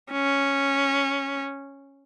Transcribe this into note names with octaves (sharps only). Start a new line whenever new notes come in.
C#4